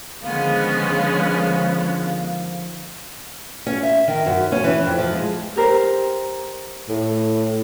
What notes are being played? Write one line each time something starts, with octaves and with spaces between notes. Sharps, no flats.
D3 D#3 F3 G#3 B3 C#4 F5
C#4
E5
D#3
F#2
C#4
E3
F2
F3
G#3
G4 A#4 C5
A2